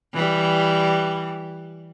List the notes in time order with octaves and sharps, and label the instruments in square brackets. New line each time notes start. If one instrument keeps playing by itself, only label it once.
[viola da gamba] E3 G3